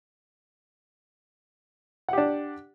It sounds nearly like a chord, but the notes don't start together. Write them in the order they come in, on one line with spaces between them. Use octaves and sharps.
F#5 G4 D4